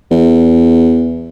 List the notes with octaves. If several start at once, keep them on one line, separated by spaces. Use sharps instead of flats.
E2